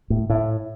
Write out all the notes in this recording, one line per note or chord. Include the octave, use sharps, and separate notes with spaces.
A2
A2